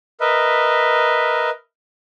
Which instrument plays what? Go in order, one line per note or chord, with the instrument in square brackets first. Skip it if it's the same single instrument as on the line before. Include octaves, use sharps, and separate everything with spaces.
[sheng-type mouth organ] A#4 B4 D#5 E5